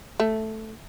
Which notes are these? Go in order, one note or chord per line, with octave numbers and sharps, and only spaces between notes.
A3